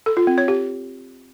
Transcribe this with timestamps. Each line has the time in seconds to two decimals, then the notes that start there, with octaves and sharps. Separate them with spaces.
0.06 A4
0.17 F4
0.27 C4
0.38 C#5
0.48 G4